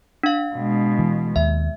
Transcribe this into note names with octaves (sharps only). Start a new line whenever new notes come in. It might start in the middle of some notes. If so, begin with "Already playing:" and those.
D4 F5
B2 G#3
E3
D#2 E5